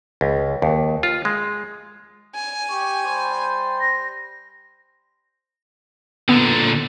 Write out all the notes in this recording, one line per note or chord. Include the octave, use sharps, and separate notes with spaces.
C#2
D#2
F4
G#3
G#5
G4 C#6
G3 C5
A#6
A#2 D3 B3